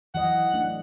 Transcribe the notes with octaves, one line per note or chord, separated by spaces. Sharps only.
E3 F#3 D#5 F#5
A3 D4